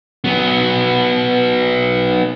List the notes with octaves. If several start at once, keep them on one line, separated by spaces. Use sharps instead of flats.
F#3 B3